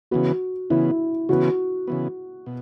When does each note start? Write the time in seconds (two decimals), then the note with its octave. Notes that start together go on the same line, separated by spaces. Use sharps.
0.11 C#3 E3 B3 F#4
0.70 C#3 E3 B3 E4
1.29 C#3 E3 B3 F#4
1.88 C#3 E3 B3
2.46 B2